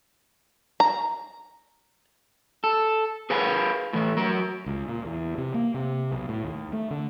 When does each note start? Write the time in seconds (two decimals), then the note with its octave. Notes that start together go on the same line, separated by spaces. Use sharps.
0.80 A#5
2.64 A4
3.30 G#4 A#4 B4 F5 G#5
3.93 A2 E3 A3
4.17 F#3 A#4
4.66 C#2
4.88 A#2
5.05 E2
5.38 C3
5.54 A#3
5.74 C3
6.11 B1
6.29 A2
6.44 D#2
6.73 A3
6.91 D3